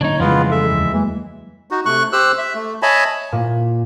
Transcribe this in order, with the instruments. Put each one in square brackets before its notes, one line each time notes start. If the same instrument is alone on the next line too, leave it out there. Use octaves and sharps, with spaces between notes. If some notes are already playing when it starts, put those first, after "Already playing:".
[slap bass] D3 F#3 A#3 [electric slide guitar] D4 D#4 [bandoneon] C#5
[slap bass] F2 C#3 G3 [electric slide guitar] E3 G#3 [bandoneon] B3 F4
[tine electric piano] A4 [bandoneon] E5
[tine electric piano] D#2
[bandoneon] E3 [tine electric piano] F#3 G#3 A#3
[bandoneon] D#4 F#4
C3 A3 C#6 F#6
G4 C5 E6 F#6
E5
A3
C#5 D#5 E5 G#5 A5 B5
[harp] A#2